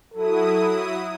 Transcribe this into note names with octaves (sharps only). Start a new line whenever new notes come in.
F#3 E4 A4 D#6